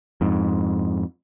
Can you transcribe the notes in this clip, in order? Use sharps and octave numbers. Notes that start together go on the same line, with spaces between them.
F2 G#2